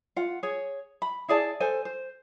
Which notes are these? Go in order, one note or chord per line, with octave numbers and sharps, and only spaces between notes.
F4 F#5
G#4 C#5
B5
E4 G#4 D5 A5
A4 C5 G#5
C5